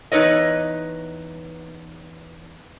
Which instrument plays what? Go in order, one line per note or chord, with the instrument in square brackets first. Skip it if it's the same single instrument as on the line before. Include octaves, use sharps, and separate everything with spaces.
[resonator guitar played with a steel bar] E2 D#4 B4 C#5 D#5